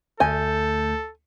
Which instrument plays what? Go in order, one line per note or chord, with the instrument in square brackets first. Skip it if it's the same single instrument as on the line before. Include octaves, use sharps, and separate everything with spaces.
[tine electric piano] D2 A3 G6 [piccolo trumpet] A4 [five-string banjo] G#5